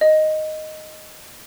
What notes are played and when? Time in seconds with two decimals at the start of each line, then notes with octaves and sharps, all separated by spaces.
0.01 D#5